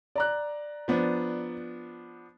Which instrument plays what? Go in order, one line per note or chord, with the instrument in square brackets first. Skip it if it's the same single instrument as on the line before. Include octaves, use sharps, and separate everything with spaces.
[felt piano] D5 A#5 F#6
[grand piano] F3 B3 D4